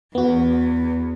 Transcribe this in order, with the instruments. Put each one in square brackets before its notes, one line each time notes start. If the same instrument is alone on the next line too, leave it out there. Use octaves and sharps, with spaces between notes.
[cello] E2 [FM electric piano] B3 F#4